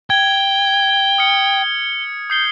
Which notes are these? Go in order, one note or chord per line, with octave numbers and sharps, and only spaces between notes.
G5 G#6 G7
D#6 F6 C#7
D#6 G6 C7 G7